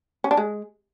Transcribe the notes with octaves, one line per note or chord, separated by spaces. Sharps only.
C#4
D4
G#3